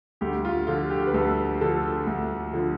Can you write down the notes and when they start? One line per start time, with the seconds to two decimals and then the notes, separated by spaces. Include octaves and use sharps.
0.21 D2 G4
0.45 F4
0.67 D3 F3 F4
0.90 G4
1.07 B4
1.14 D2 A4
1.61 D3 F3 A4
2.07 D2
2.53 D3 F3